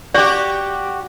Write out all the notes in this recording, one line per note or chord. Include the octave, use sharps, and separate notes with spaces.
F#4 G4 D5